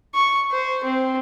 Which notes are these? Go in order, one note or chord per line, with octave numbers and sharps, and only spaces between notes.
C#6
C5
C4